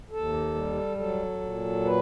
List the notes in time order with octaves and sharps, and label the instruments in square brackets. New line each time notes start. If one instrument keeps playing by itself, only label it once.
[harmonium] D#2 A4
G3
F#3 A4
A#2
B4